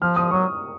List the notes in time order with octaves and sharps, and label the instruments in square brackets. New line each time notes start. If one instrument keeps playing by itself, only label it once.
[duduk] F3 [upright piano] F6
[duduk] F3 [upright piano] D#6
[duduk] F#3 [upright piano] C#6